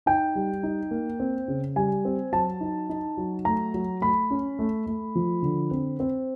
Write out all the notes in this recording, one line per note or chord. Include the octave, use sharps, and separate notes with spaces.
D#4 G5
G3
D#4
A#3
C4
C#3
G3 G#5
C4
F#3 A5
D#4
D#4
F#3
A3 A#5
F#3
A3 B5
C#4
A3
A3
F3
D3
C4
C4